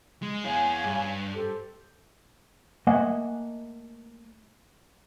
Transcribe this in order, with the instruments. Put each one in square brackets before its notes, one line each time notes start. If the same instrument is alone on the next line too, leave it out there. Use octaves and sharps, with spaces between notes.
[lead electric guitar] G#3
[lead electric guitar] E4 G#4 [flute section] C#5 F5 G#5
[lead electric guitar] G2
[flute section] G4 A4 C5
[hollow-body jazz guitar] A3 A#3 D#5 F#5 G#5